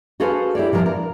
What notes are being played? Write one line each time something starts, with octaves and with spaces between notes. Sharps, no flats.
F#4 G#4 A4 B4 C5 F5
E4 G4 C#5 D5
C3 F3 G#3 A#4
A#4